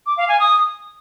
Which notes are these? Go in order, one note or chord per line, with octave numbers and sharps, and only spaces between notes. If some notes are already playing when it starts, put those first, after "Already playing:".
D6
F5
G#5
D#6